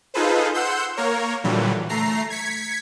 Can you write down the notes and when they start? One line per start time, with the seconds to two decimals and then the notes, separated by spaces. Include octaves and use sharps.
0.14 D#4 F4 G#4 A4 B4 C5
0.54 F#5 C6 E6 G6
0.97 A#3 A#4 C#5
1.44 A#2 D3 E3 F#3 G3
1.89 A3 A#5 C7
2.30 G#6 B6 C#7